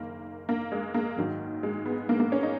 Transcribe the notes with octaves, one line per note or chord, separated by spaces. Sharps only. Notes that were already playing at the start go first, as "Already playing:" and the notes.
Already playing: F#1 D#3 A#3
A#3
G#3
A#3
G#1 G#2 D#3 F#3
G#3
B3
A#3
A#3
C#4
D#4